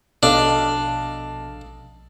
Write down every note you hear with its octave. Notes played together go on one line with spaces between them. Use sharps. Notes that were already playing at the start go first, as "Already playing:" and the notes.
A#1 B2 D4 A4 D#5 F5